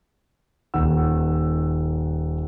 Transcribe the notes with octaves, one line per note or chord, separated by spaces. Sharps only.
D#1 D#3 F#5 E6